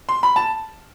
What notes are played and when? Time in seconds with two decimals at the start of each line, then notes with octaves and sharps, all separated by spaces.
0.09 C6
0.23 B5
0.36 A5